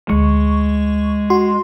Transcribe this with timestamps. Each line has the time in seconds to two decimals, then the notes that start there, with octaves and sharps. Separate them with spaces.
0.10 D2 G#3 C#6
1.30 F#4 C6